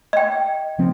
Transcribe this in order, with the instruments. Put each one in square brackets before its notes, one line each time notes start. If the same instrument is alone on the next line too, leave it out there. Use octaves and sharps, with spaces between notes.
[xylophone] D#5 G5
[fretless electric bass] C#3 F3 C4